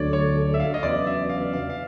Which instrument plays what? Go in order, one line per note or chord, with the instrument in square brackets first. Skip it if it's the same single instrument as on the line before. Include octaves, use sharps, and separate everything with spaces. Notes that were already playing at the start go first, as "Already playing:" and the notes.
Already playing: [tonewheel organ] D2 D3 F#3 A3 D4 [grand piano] C#5 D5
[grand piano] C#5
E5
F5
D#5
[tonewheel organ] E2 C#3 F#3 B3 D4 [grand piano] D5
[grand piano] E5
F5
F5
F5